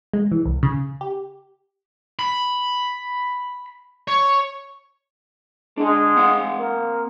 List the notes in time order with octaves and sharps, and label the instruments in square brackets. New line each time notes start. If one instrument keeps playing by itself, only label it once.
[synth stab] G#3
E3
C2
C#3
G4
[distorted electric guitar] B5
C#5
[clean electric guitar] D3 D4 [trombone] G#3
[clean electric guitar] C4 F5 F#5
[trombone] A#3